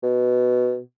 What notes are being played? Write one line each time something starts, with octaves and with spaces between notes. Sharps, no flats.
B2